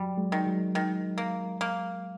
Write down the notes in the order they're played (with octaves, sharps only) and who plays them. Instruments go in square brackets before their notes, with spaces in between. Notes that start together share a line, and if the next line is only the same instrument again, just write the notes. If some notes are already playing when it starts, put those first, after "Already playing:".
Already playing: [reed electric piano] F#3 [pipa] G3
[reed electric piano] F#3 G#3
[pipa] D#3
[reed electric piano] F#3 G#3
[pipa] D#3
A#3
A#3